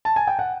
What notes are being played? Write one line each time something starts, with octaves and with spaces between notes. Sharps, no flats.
A5
G#5
G5
F#5